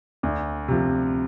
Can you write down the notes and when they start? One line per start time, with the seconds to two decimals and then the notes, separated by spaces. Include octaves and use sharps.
0.23 D2
0.68 C3 F3